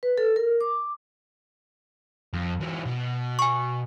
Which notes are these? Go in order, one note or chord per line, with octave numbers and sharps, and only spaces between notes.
B4
A4
A#4
D6
F2
E3 F#3
B2
G#5 C#6